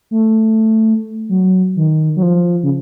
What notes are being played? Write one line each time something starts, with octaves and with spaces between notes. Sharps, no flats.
A3
F#3
D#3
F#3
F3
C#3